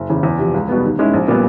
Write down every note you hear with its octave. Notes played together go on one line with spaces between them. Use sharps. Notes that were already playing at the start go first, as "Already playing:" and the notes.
Already playing: F#1
E2 C#3
E2
C3 F3
C#2
B2 G3 B3
D#2
D#3 G#3 C#4 E4
A#1
A#2 G3 B3